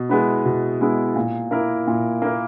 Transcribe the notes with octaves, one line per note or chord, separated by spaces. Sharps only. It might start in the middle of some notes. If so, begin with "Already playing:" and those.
Already playing: B2
G#3 B3 E4
B2
G#3 B3 E4
A#2
A#3 E4 A#4
A#2
A#3 E4 A#4